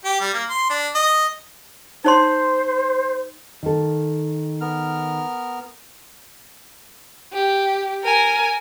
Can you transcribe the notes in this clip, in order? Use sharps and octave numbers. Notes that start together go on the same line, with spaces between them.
G4
G3
A#3
C6
D4
D#5
D#4 C5 C#5 C6
D#3 A4
B3 A#4 F6
G4
A#4 G#5